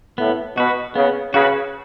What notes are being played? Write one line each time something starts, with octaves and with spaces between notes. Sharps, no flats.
A2 B3
B2 F#4 B4
C#3 B3
C#3 F#4 B4